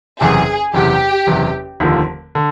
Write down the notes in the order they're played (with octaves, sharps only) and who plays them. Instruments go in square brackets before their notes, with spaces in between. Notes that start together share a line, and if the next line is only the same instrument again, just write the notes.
[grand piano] F#1 E2 C3 [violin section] G#4
[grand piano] F#1 E2 C3 [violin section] G4
[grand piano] F#1 E2 C3
F1 D#2 D3 F3
D3